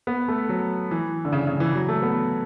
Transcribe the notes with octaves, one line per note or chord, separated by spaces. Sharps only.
B3
A3
F#3
E3
D3
C#3
C#3
E3
F#3
A3
B3